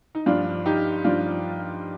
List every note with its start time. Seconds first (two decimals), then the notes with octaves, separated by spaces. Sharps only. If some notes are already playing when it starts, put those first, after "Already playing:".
0.15 D#4
0.26 G2 F3 D4 F4
0.66 D#4 G4
1.04 G2 F3 D4 F4